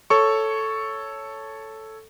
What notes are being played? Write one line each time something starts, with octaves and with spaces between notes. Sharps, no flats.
A4 C#5 C#6